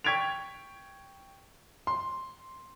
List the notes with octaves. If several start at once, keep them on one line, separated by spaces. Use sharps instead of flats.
G5 C#6 G#6 B6 D7 F7
C6